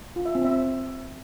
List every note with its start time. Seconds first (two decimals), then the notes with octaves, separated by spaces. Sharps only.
0.16 F4
0.26 E5
0.35 C4
0.44 E5